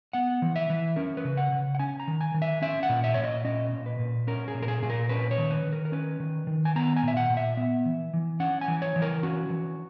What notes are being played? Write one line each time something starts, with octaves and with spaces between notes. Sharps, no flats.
B3 F#5
E3
E5
E3
C#4 A#4
B4
C#3
F#5
C#3
F#5
C#4 G#5
A#5
D#3
G#5
D#3
E5
C#4 E5
F#5
A#2
E5
A#2 C#5
D#5
C#4 D#5
A#2
B4
A#2
C#4 A#4
G#4
A#2
A#4
G#4
A#2 G#4
A#4
C#4 B4
C#5
D#3
B4
D#3
A#4
A#4
C#4 B4
D#3
D#3
G#5
B3 A#5
G#5
A#2
E5
F#5
A#2
E5
B3 E5
E3
E3
C#4 F#5
G#5
E3
C#5
E3
A#4
C#4 F#4
E3